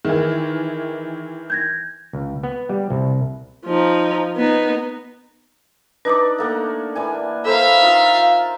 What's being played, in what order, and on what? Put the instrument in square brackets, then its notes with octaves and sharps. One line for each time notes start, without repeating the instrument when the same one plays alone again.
[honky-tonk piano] D#3 E3 [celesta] G#4 E5
[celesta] G6 G#6 A#6
[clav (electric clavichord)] C#2
B3
G3
C2
[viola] F3 D#4
B3 D#4
[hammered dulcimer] D4 D#4 D5 [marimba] B4 D6
[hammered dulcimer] A3 A#3 F#5
E3 D4 G#5
[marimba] A4 [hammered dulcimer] A#4 C5 B5 [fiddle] E5 F5
[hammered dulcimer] D#4 F4 C6
[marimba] F5